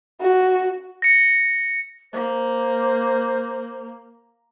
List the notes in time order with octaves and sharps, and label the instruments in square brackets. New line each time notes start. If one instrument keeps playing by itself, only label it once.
[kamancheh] F#4
[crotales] A#6 C#7
[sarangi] A#3 [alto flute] C5